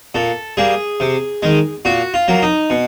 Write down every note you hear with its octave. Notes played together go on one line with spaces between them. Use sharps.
A#2 A4
G3 A#3 G#4
C3
D#3 G#3
A#2 F#4
F4
F#3 A#3
D#4
B2